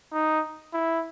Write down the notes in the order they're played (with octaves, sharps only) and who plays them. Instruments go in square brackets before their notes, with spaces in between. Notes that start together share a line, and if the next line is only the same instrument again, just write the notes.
[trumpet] D#4
E4